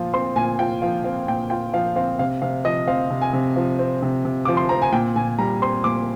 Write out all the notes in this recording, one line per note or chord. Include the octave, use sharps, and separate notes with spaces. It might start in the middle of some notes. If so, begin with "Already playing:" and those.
Already playing: A#2 F3 F4
C4 C6
A#2 G#5
F4 G5
F3 F5
C4 F5
A#2 G5
F4 G5
F3 F5
C4 F5
C3 F5
C3 F5
F3 D#5
C4 F5
C3
G#5
C3
F3
C4
C3
C3
F3 D6
C6
C4 A#5
G#5
A#2 G5
A#2 G#5
G3 A#5
C4 C6
A#2 D6